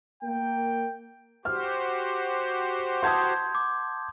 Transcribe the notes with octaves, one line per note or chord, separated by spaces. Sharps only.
A#3 G5
F#4 G4 C5 F6
F#5 A5 C6 D#6 G6 G#6
D6